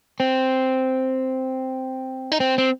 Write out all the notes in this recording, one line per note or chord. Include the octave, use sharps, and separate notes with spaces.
C4
D#4
C4
C4